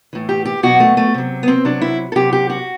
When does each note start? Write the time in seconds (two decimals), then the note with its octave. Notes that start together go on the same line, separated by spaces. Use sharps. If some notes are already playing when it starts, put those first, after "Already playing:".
0.13 A2 E3
0.29 G4
0.45 G4
0.63 B2 F#3 F#4
0.80 A3
0.97 A3
1.14 C3 F#3
1.43 B3
1.48 C4
1.65 C3 F#3 D4
1.82 E4
2.12 A4
2.16 C3 F#3 G4
2.33 G4
2.50 F#4